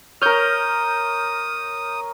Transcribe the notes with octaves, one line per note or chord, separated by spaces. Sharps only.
A#4 C#5 D#6 F6 G6